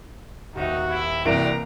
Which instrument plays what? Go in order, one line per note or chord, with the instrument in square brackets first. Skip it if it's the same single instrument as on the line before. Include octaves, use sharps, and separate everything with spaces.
[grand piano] D#1 D#2 E5 [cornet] D#4 [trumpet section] F#4
[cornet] E4
[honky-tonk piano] C2 E3 D7 [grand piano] A#3 [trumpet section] F#4 G4 D5 [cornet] A#5